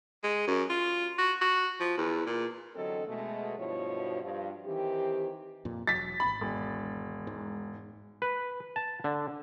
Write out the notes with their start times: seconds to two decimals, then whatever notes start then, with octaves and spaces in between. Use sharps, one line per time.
0.23 G#3
0.47 F#2
0.70 F4
1.18 F#4
1.41 F#4
1.80 F3
1.97 E2
2.26 A#2
2.75 E2 D3 F#3 C4 A4 D#5
3.07 B2 G#3 A3
3.58 G2 B2 F3 E4 F#4 C#5
4.22 G2 F3
4.66 D#3 E3 C4 G4
5.65 F2 A#2
5.87 E1 F#3 A6 B6
6.20 D1 G#1 B5
6.41 E1
7.27 G#2
8.22 B4
8.76 A5
9.04 D3